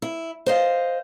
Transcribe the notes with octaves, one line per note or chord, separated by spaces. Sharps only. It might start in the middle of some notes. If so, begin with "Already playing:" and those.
E4
C5 D#5 F5